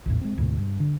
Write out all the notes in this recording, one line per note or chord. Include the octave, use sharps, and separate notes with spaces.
A#1 E2 A2
G#3 C4
D2 G#2 B2
G2
D3